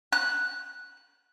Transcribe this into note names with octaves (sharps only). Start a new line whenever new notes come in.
F#6